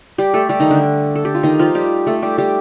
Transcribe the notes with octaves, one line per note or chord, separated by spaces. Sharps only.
G3 G4
A3 A4
G3 G4
D#3 D#4
D3 D4
A4
G4
F4
D#3 D#4
F3 F4
G3 G4
A3 A4
G3 G4
G3 G4